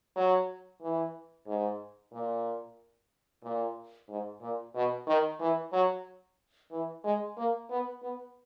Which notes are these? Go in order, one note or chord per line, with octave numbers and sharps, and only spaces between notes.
F#3
E3
G#2
A#2
A#2
G#2
A#2
B2
D#3
E3
F#3
E3
G#3
A#3
B3
B3